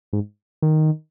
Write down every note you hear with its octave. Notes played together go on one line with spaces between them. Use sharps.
G#2
D#3